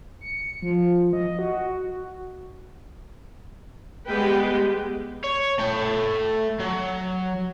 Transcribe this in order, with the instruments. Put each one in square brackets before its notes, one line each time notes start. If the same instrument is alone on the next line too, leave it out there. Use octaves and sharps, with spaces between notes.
[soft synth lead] C#7
F3
D#5
F#4
[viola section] G3 G#3 B3 B4 G5
[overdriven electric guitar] C#5
A3 G5
F#3